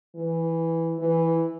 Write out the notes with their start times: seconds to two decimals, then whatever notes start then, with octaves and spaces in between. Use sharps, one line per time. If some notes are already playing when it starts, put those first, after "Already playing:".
0.16 E3
0.99 E3